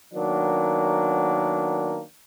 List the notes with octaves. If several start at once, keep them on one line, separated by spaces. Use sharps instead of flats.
D#3 F#3 A#3 B3 D4